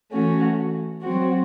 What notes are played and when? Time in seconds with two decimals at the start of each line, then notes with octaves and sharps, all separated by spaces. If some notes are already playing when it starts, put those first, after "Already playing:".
0.12 E3 A3 C#4 F#4
1.02 F#3 C4 F#4